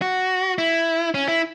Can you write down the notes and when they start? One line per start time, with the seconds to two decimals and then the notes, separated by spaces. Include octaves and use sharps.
0.02 F#4
0.58 E4
1.14 C#4
1.28 E4